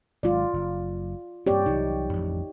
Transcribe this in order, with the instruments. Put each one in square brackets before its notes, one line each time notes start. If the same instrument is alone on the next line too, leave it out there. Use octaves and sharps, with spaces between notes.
[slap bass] G#1 G#2 F#3 [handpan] F4 D5
[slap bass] F#1
[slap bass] G2 A#3 C4 [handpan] G4 C#5 D5
[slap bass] C2 E3 F#3 [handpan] D#4
[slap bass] A1 F2